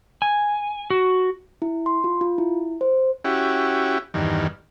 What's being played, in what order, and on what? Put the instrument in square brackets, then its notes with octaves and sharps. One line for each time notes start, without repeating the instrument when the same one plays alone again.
[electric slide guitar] G#5
F#4
[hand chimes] E4
C6
F4
F4
E4
C5
[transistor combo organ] C#4 E4 F#4 G4
E2 G2 D#3